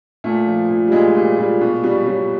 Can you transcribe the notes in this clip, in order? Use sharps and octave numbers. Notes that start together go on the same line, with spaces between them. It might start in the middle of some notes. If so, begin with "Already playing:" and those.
A#2 A3
F3
A#2
G3
A#2 G#3
A#2 G3
A#2 G3
B2
B2 G3
G3
B2 F#3